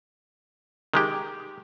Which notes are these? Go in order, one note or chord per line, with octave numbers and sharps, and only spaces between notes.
D#3 G#3 G4